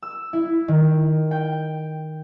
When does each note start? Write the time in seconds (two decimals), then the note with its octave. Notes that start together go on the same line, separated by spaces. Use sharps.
0.02 E6
0.33 E4
0.68 D#3
1.31 G5